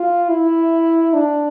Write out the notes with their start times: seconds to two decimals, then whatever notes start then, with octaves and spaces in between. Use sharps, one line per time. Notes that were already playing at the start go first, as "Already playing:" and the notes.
Already playing: F4
0.29 E4
1.14 D4